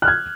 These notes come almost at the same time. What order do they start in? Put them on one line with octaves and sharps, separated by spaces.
F#6 F6 G#6